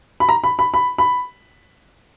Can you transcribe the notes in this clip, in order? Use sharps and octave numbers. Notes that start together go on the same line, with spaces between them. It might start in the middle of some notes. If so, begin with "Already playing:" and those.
B5
A#5
B5
B5
B5
B5